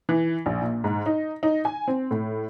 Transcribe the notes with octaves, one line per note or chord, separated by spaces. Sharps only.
E3
A#1
A#2
G#2
D#4
D#4
G#5
C4
A2